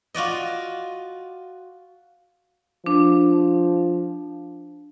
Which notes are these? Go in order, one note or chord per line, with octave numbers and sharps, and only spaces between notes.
F4 F#4 D5 D#5
F3 D4